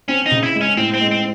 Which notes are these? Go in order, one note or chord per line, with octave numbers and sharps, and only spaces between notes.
C4 C#4
D#4
C#3
E4
G#3
C#4
A2 C4
C4
G#3
C4